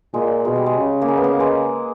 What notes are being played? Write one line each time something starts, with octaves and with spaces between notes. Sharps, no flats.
A#2 G#3
B2 G#3
G3
G#3
C#3
A#3
G#3
B3
A#3
G#3